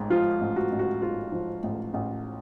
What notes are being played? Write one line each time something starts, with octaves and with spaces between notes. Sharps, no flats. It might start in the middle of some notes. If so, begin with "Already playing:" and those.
Already playing: A1 G#2
F3 F4
A1
F#4
A1
F#4
G#2 F4
F3
A1
A1